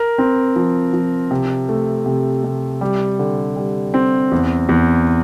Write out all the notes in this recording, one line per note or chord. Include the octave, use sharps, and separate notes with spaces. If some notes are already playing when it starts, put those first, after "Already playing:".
Already playing: A#4
C4
F3
F3
C3
A3
C3
C3
G3
D3
G3
C4
E2
E2